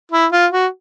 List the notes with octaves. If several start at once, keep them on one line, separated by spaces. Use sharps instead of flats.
E4
F4
F#4